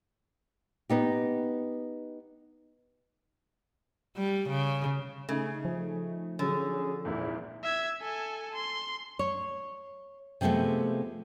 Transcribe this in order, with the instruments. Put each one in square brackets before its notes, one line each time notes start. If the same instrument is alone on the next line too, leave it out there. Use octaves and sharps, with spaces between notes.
[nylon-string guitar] B3 D#4 G4
[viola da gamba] G3
C#3
[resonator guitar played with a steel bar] C#3 [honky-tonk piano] A3 D#4 G#5
[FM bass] F3
[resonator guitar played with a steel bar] D3 [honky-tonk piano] F#3 C#4 [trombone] G#4
[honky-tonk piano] G#1 E2 A#2 [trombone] E4
[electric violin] E5 G#6
A4 G#5
C6
[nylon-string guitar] C#5
C3 F3 G#3 A3 B3